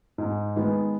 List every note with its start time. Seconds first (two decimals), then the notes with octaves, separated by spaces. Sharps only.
0.18 G#2
0.56 D#3 G#3 B3